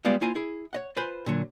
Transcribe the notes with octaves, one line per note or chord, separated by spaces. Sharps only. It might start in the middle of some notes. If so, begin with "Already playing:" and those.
G3 G#3 B3 F4 D5 F5
A#3 E4 F4 C5 G#5 A#5
E4 G#4
C#5 D#5 F#5
F4 B4 C5 G#5 B5 C6
A#2 D3 F#3